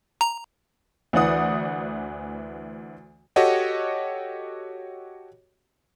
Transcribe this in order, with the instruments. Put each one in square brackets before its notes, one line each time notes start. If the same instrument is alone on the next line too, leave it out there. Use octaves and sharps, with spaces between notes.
[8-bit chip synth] A#5
[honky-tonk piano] D2 E3 D5 F#5 D#6
[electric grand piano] F#4 G4 A4 C#5 D#5 F#5